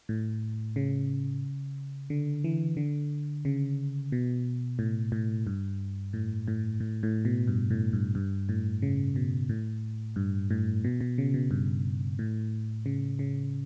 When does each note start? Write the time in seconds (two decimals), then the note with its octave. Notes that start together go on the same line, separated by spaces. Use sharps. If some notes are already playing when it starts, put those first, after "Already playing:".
0.09 A2
0.76 C#3
2.10 D3
2.44 E3
2.77 D3
3.45 C#3
4.12 B2
4.79 A2
5.12 A2
5.47 G2
6.13 A2
6.48 A2
6.80 A2
7.03 A2
7.25 B2
7.47 G2
7.70 A2
7.93 G2
8.15 G2
8.49 A2
8.82 C#3
9.16 B2
9.49 A2
10.16 G2
10.50 A2
10.84 B2
11.01 B2
11.18 C#3
11.34 B2
11.51 G2
12.19 A2
12.86 C#3
13.19 C#3